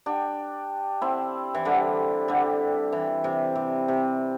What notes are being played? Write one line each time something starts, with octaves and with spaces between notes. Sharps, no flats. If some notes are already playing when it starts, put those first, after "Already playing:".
D4 G4
C4 E4
E3
D3 G3
D3 G3
E3
C3
C3
C3